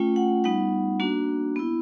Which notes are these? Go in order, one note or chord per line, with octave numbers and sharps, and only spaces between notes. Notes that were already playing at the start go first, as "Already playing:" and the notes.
Already playing: A3 C#4 F4 G5
F#5
G3 B3 D#4 F#5
A#3 D4 F#4
B3 E4